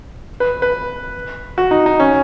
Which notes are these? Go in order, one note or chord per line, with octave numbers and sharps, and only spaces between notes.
B4
B4
F#4
D#4
D#4
C#4